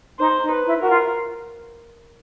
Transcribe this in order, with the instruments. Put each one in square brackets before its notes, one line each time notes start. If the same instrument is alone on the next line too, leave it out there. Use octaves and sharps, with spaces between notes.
[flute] D#4 [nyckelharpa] C5
[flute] D#4
[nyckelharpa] B4
[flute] E4
[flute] F#4 [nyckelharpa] A#4
[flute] F4